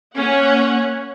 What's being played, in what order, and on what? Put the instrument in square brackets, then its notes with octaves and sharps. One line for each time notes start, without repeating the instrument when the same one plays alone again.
[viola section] A#3 C#4 F#5